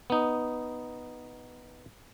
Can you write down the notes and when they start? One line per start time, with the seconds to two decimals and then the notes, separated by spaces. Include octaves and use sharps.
0.10 B3 D#4